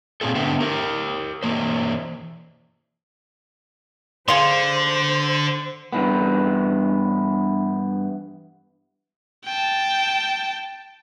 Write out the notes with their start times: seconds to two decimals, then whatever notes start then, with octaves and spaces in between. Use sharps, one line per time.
0.21 A#2 G3 C4 F4 G#4 A4
0.35 D3 B3 C4 E5 G5
0.60 G4 A#4
1.43 E3 A#3 C5
4.28 D3 G#4 C5 F5 C6
5.93 G2 E3 B3
9.45 G5 A5